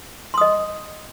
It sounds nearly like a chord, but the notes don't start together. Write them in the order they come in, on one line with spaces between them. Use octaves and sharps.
C6 D#6 D#5